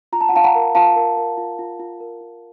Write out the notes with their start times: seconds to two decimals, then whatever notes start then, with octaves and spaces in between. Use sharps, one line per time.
0.12 F4 A#5
0.21 A5
0.29 F#5
0.33 F4 F5 A5
0.44 F#5 A#5
0.55 A#4
0.75 F4 F5 A5
0.96 A#4
1.17 A#4
1.37 F4
1.59 F4
1.79 F4
2.00 A#4
2.21 F4